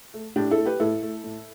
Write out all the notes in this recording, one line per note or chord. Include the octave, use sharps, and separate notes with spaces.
A3
A2 D4 G4
E4 A4
A3
G4 B4
A2 E4 A4
A3
A2